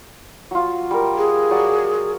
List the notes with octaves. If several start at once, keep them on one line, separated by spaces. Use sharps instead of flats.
F#3 F4
G3 A#4
G#4
F#3 D5